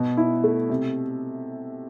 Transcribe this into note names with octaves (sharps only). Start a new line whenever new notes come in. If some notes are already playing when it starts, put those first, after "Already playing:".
Already playing: B2
E4
A3
C3